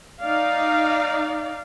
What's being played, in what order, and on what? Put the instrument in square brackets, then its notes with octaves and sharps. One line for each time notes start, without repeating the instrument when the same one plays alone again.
[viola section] D#4 D5 F5